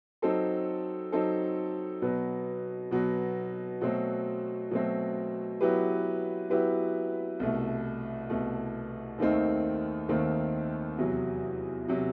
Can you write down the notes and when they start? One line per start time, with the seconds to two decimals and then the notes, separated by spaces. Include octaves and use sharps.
0.22 F#3 C4 D#4 A4
1.12 F#3 C4 D#4 A4
2.02 B2 F#3 B3
2.91 B2 F#3 B3
3.81 B2 F#3 A3 C4
4.71 B2 F#3 A3 C4
5.61 F#3 B3 E4 G4 B4
6.50 F#3 B3 E4 G4 B4
7.40 C2 B2 A3
8.30 C2 B2 A3
9.18 D#2 D#3 A3 C4 D#4
10.09 D#2 D#3 A3 C4 D#4
10.98 E2 C3 F#3
11.88 C3 F#3